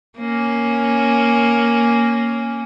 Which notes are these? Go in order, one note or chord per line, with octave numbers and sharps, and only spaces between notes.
A#3 C#4